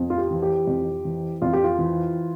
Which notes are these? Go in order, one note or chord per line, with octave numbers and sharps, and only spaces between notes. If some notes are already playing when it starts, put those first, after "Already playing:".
Already playing: F2
F4
G4
E3
G4
F2
E3
F2 F4
G4
F4
E3